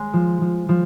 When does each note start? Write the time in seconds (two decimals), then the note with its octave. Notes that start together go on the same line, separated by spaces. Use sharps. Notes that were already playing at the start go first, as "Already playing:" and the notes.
Already playing: G#3
0.13 F3
0.41 F3
0.69 F3